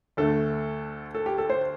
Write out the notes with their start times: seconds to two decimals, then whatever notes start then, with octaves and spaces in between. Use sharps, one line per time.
0.17 D2 D3 A3 A4
1.15 A4
1.26 G4
1.38 A4
1.50 C5